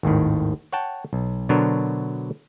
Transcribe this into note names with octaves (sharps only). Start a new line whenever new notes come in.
G#1 D#2 A2 D#3
C#5 F#5 G5 A5
B1
B2 D3 F#3 D4 A#4 C5